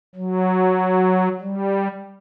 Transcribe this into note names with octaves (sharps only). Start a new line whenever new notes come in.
F#3
G3